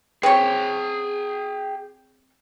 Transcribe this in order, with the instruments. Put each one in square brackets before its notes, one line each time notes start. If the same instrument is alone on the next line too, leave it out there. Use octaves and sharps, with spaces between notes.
[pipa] C4 C#5 [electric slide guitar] G#4 G5